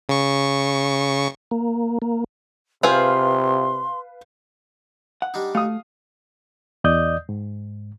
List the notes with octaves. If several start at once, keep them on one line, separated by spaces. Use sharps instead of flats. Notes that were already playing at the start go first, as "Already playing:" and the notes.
C#3 C#6
A#3
A#3
C3 F4 G#4 B4 C5 F5 C6 F6
F#5
G3 D4 D#4
A3 F5 D#6
E2 D5 D#5 D#6 G6
G#2